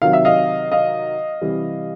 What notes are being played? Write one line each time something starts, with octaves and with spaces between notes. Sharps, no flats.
C3 D#3 F#3 F5
E5
D#5 F5
D#5 F5
C3 E3 G3